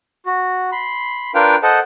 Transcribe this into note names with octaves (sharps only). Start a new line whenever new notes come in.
F#4
B5 C6
D4 F4 A#4 B4 F5 G5
A4 C5 D#5 F#5 A5